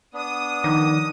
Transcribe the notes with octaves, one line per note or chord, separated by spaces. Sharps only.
B3 D4 D#6
D#3 F3 D#4 D6